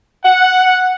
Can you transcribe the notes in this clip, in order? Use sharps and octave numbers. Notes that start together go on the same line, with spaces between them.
F#5